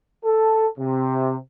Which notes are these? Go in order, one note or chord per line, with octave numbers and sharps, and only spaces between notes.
A4
C3